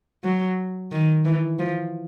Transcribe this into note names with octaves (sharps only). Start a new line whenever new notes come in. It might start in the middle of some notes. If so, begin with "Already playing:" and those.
F#3
D#3
E3
F3